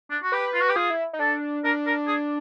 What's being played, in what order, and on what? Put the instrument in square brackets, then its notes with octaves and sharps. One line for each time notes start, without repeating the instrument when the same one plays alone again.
[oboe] D4
F#4
[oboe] G4 [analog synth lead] B4
[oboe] F4
F#4
G4
[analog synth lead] F4 [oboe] G#4
[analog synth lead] E4
D#4
[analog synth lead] D4 [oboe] A4
[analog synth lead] D4 [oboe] A#4
[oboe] A#4
G#4